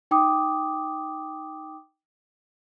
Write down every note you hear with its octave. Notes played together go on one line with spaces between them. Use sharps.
D#4 G5 D6 D#6